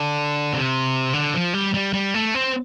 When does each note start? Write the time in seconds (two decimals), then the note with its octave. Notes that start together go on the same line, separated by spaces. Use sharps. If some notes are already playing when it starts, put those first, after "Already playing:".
Already playing: D3
0.53 C3
1.13 D3
1.34 F3
1.54 G3
1.74 G3
1.93 G3
2.14 A3
2.34 C4